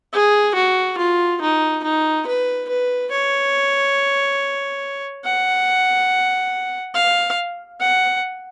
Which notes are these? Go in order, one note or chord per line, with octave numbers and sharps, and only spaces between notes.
G#4
F#4
F4
D#4
D#4
B4
B4
C#5
F#5
F5
F#5